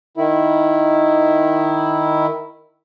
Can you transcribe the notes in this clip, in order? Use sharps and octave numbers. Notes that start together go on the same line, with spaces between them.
D#3 E4